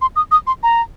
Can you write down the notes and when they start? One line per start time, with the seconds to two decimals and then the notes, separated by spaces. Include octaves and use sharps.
0.02 C6
0.16 D#6
0.31 D#6
0.47 C6
0.63 A#5